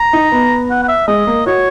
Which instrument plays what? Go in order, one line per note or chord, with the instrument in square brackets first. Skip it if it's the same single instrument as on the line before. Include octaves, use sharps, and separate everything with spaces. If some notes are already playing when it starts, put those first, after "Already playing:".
Already playing: [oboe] A#5
[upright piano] D#4
B3
[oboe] F#5
F#5
E5
[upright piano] G#3 [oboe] D#5
[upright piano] A#3
[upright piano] F#4 [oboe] C#5